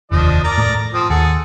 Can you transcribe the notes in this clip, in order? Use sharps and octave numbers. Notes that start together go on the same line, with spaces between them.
F1 D#2 F3 D4 D#5
A#4 D5 A#5
A2
F3 C4 D#6
D#2 G#4 A4 F#5